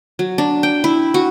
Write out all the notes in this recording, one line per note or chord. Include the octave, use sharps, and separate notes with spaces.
F#3
D4
G5
E4
F#4